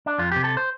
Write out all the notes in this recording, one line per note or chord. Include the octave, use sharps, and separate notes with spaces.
D4
F2 F4
C3 G4
A4
C5